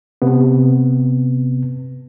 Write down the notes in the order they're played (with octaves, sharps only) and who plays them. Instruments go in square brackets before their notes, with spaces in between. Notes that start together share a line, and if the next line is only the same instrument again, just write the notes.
[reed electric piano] C3 B3